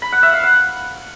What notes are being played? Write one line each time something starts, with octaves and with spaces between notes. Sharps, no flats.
B5
F#5
E5
F5
F#5